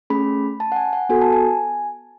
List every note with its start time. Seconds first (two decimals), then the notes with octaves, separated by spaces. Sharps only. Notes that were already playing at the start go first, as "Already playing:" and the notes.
0.10 A3 C#4 G#4 B5
0.60 A5
0.72 F#5
0.76 G#5
0.93 F#5
1.09 B3 F#4 A4 G#5
1.21 A5
1.33 G#5